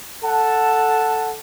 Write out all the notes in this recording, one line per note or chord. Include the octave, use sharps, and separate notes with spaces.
A4 F#5 A5